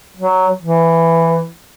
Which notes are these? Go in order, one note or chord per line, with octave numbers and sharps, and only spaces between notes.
F#3
E3